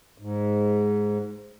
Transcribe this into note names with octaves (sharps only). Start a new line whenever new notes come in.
G#2